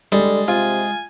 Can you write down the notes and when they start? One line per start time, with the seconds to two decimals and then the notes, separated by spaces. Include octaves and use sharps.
0.12 D3 G3 G#3
0.48 C3 F4 G#5